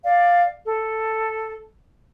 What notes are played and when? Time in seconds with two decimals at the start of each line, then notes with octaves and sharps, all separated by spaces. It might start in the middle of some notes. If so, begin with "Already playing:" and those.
0.04 D5 F5
0.64 A4